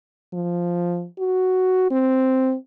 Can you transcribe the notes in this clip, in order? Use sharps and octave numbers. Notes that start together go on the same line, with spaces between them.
F3
F#4
C4